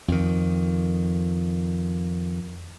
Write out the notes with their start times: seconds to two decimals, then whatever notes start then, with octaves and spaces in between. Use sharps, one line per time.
0.08 F2 D#3